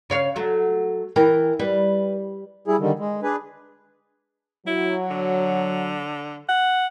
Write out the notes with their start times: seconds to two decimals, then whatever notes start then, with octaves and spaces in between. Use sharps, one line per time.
0.10 C#3 C#5 F5
0.36 F#3 A3
1.16 E3 E4 A#4 G5
1.60 G3 B4
2.68 G3 E4 G#4
2.80 D3 D#3 G3
2.99 G#3
3.23 D4 G#4 B4
4.67 F#3 E4
5.10 D3
6.49 F#5